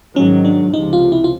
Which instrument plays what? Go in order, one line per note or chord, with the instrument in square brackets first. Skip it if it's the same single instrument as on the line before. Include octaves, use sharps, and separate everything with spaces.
[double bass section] G#2 D#3 F#3 [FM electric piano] C#4
[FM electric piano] D4
[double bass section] C#2 C3 F3 [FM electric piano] D#4
[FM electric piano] F4
E4
F4